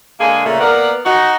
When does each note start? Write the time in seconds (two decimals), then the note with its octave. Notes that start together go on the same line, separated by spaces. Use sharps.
0.20 D3 G#3 A#3 G#4
0.45 A#2 C#3 A3
0.60 A#3 B3 A#4 D5 F#5
1.05 D#4 F#4